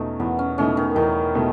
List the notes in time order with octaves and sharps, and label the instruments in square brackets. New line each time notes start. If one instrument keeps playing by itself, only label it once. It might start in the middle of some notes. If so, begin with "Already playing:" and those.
Already playing: [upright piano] E2 B2 A3 D#4 [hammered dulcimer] C#4
[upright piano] E2 [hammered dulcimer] B3
[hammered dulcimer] C#4
[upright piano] B2 A3 D#4 [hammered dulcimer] C#4
[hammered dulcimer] D#3
[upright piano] E2 [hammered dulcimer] D#3
[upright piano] B2 A3 D#4